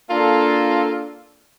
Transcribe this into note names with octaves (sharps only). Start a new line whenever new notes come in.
A#3 D4 F4 A4